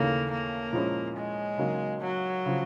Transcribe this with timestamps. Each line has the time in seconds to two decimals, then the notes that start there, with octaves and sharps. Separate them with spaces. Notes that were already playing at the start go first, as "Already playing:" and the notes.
Already playing: D#2 C#3 E3 A3 A#3 C#4
0.31 A#3
0.73 A#2 F3 G#3 C#4 E4
1.16 G#3
1.58 C#3 F#3 A#3 D#4
2.01 F#3
2.46 C#3 F3